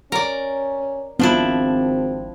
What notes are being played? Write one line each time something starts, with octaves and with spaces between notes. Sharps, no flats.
C#4 A#4 D5
G#1 F3 B3 C4 D4 E4 F4